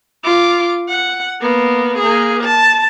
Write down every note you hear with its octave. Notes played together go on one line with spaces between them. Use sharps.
F4 D6
F#5
A#3 B3
A#3 G#4
A5